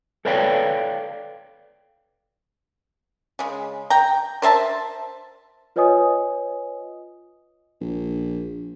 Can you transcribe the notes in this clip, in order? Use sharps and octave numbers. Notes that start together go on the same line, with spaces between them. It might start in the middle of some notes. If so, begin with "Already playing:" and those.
A4 B4 C#5 D5 F5 G5
C#3 G#3
G5 A#5
A#4 C5 E5 A5
F4 B4 C#5 D#5 G#5 D#6
A#1